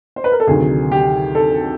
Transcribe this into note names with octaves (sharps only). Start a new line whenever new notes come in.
C5
B4
A#4
A4
D2 C3 D#3 F#3 G#4
G4
A4